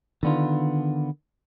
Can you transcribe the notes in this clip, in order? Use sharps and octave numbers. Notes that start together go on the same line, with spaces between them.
D3 D#3 B3 D4 F4